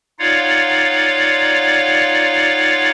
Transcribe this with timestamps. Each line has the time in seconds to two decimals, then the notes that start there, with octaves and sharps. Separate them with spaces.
0.19 D#4 F4 C#5 D5 F5 F#5